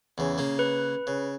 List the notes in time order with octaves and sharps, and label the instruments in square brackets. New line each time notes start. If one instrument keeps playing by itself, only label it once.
[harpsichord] E2 C#3
C#3 A#3
[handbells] B4
[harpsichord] C#3